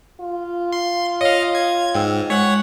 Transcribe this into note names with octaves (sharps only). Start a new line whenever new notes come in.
F4
C6
C#5 D#5 F5
G#6
G#2 G5 E6
G#3 C#5 F#5